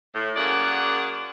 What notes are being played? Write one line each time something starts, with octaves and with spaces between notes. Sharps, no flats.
A2
F#2 A#3 G#4 D5 F#5